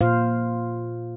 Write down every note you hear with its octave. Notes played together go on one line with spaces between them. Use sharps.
A#2 F4 C5 F5